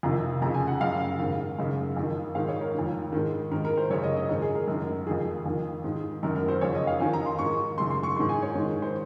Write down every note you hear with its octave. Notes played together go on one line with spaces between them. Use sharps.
F2 C3 D#3 A#5
F2 C#3 A#5
G#5
F#5
F#2 C#3 F5
G#2 D#3 F5
F#2 C#3
F2 D#3
G#2 D#3 F5
C#5
A#4
F2 D#3
G#2 D#3
G#2 D#3 A#4
A#4
C5
F#2 C#3 C#5
D#5
D#5
G#2 D#3 A#4
G#4
A#4
F#2 D#3
F2 D#3 G#4
F2 D#3
G#2 D#3
F#2 D#3 A#4
A#4
C5
F2 C#3 C#5
D#5
F5
F2 D#3 G#5
A#5
C6
G#2 D#3 C#6
F#2 C#3 C6
C6
C#6
G#2 D#3 C6
G#5
C#5
G#2 D#3
C5